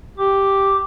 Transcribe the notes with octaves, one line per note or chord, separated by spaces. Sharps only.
G4 D6